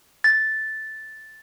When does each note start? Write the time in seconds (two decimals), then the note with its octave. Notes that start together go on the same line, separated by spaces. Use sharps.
0.24 A6